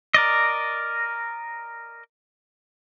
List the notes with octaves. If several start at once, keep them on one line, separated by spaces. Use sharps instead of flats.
A#4 D5 D#5